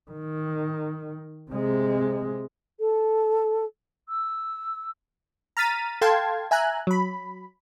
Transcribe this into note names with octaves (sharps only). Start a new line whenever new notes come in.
D#3
C3 G#3
A4
E6
A#5 F6 A6 B6 D#7
A4 F5 G5 A5 C6 G#6
E5 G#5 A#5 F#6
F#3 B5